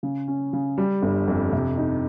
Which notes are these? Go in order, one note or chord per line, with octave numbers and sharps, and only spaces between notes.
C#3
C#4
C#3
G3
G1
F2
C3
D#4